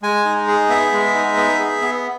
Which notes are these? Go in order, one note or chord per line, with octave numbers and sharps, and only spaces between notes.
G#3 G#5
D#4
G#4
B3 E5
G#3
D#4
B3
G#4
B3